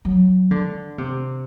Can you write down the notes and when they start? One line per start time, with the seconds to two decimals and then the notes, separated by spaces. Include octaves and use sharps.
0.05 F#3
0.51 D3
0.98 C3